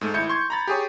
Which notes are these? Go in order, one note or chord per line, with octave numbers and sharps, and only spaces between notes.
G#2 A3
G#1 E4 G6 C#7
C6 C#6 G#6
A#5 B5 A6
G4 G#4 C#5